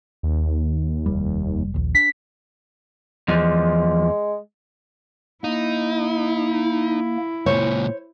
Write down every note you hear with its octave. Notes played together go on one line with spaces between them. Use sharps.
D#2
F1 G3
A#1 D#2
D4 B6
E2 F3 G#3
A#3 D#4 E4
C#2 A#2 C5 C#5